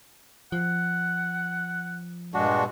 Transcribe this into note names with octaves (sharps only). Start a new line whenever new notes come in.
F3 F#5
G2 A#2 G#3 D4 F#4